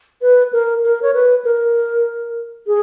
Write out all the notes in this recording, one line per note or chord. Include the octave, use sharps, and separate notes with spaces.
B4
A#4
A#4
C#5
B4
A#4
G#4